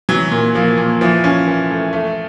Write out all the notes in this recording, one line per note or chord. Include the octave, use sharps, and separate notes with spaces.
E3 F#3
A#2
F3 A#3
A#2
E3 F3
C#4
E3
A3
A3